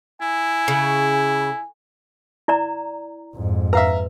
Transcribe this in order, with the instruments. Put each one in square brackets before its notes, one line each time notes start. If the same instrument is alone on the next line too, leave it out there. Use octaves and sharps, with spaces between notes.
[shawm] E4 [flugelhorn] G#5
[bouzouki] C#3
[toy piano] E4 D5 A#5
[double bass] F2 G#2
[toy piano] B4 [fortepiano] E5 F5 A#5